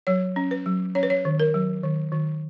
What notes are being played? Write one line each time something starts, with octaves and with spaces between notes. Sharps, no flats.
F#3 C#5
C#4
B4
F#3
C#4 C#5
B4
C#5
D#3
A#4
F#3
D#3
D#3